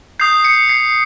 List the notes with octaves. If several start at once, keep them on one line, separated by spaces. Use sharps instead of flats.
D#6 G6 C7
C#7
C7